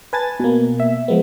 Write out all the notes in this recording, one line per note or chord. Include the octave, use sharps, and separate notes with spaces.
B4 G#5 A5 A6
B2 A#3
E5
F3 G#3 B3